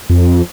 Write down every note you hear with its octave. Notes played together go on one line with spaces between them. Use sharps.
F2